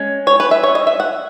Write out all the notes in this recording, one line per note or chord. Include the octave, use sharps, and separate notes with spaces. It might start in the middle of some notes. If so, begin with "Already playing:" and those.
Already playing: G#3 C#4
C#5
B4
E5
C#5
D#5
E5
F#5